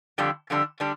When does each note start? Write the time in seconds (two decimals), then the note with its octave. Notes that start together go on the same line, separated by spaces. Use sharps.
0.18 F2 D3 G3 D4
0.50 F2 D3 G3 D4
0.80 D3 G3 D4